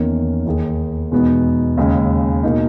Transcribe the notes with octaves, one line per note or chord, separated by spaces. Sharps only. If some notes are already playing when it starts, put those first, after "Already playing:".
Already playing: E2 D#3 A#3 C#4
D#2 D#3 A#3 D#4 G#4
E2 B2 G#3 B3 D#4
D#2 C#3 G#3
B2 A#3 D#4